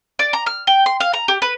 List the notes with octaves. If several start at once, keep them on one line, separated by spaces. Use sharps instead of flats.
D5
A#5
F6
G5
C6
F5
A#5
G4
B4